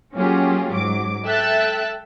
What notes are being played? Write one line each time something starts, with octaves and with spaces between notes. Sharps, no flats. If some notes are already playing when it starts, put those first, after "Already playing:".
F#3 A#3 C#4 F4 G4 G#4
G#2 F#3 D6
A4 E5 G5 E6 F#6 A6